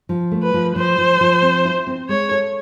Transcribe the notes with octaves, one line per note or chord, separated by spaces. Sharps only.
F3
A3
B4
F3
F3 C5
F3
F3
C4
E4
C4
G#3 C#5
A4